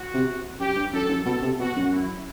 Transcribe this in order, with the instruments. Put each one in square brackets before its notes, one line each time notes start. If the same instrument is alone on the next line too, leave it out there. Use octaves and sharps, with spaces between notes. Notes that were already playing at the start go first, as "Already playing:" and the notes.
Already playing: [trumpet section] F#4
[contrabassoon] C3
[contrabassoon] F#2 [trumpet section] G4
[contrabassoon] G2
[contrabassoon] F#2 [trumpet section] A4
[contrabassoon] F#2
[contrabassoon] B2 [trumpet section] A4
[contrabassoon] C3
[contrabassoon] B2 [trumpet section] F#4
[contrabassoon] F#2
[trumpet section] E4